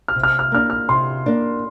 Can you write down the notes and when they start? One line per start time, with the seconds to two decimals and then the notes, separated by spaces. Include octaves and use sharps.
0.08 F6
0.15 C3
0.23 F6
0.39 F6
0.52 A#3 D4 F6
0.70 F6
0.89 C3 C6
1.26 A#3 D4